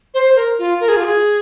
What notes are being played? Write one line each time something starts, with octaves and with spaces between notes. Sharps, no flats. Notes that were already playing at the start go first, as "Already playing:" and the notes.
C5
A#4
F4
A#4
G#4
F4
G#4